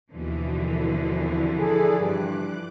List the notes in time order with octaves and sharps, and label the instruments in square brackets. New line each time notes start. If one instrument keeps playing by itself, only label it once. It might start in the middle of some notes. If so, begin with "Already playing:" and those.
[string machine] D#2 B2 [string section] D3 E3 F3
[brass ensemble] C2
[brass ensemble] G#4 A4 [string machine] D5
[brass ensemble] G2 [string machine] D6 F#6